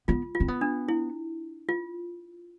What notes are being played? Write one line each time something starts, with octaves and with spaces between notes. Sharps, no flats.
B3 F4
F4
C4
B3
D4
E4
F4